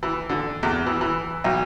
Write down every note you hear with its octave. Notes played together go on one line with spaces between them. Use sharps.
E3
D3
E2
E3
E3
B1